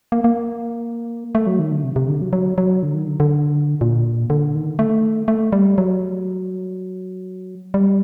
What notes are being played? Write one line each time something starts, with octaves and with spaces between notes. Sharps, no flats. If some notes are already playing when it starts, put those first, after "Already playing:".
A#3
A#3
A3
F#3
D#3
D3
C3
C3
D3
F#3
F#3
F#3
D3
D#3
D3
D3
A#2
D3
D#3
A3
A3
G3
F#3
G3